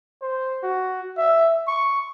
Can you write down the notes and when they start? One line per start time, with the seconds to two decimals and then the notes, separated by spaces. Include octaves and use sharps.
0.22 C5
0.63 F#4
1.18 E5
1.68 C#6